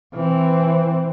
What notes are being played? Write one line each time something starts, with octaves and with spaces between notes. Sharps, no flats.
E3 C4